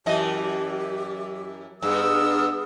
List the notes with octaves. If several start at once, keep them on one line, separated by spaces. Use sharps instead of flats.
F#2 E3 G4 D#5
G2 B3 G#4 E6